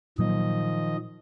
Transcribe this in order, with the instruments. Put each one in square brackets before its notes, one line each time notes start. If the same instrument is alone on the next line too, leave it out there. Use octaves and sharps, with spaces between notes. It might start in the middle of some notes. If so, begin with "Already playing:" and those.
[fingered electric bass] A#2 F#3 A#3 [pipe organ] D#3 F3 D#5